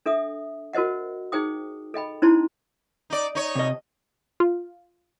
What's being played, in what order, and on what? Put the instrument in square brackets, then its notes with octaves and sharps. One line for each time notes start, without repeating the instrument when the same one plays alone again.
[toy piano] D4 A4 E5 D#6
F#4 A#4 C5 D#5 F#5
D#4 G#4 C5 G5 D#6
A4 D#5 G5 B5
C#4 D#4 E4 C5 A5 C6
[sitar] D#4 D5
D#4 C#5
[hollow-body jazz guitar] C3 D#5
[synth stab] F4